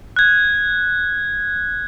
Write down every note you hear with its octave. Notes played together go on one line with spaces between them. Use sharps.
F#6 G#6